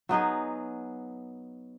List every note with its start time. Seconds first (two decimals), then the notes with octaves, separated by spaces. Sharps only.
0.09 F#3 B3 D#4 G#4